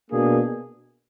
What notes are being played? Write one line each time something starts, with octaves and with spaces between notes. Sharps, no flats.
B2 A#3 D4 G#4